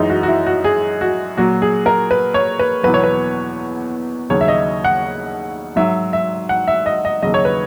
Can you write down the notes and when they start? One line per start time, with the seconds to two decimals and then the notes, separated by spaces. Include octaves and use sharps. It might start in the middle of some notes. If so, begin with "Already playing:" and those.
Already playing: F#2 E3 G#3 D#4
0.10 F#4
0.23 F#4
0.28 E4
0.46 F#4
0.64 G#4
1.01 F#4
1.37 A#2 F#3 F#4
1.62 G#4
1.86 A#4
2.11 B4
2.34 C#5
2.59 B4
2.83 E2 B2 F#3 B4
2.94 C#5
3.04 B4
4.30 D#2 C#3 F#3 C#5
4.41 E5
4.48 D#5
4.84 F#5
5.76 G#2 F#3 E5
6.13 E5
6.49 F#5
6.68 E5
6.86 D#5
7.05 D#5
7.22 D#2 C#3 F#3 D#5
7.34 C#5
7.45 B4